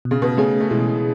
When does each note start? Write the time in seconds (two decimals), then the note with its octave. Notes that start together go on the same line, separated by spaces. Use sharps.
0.05 B2
0.11 C#3
0.22 B2
0.37 C#3 A3 C#4 G#4
0.60 A3
0.70 B2 E3 G#3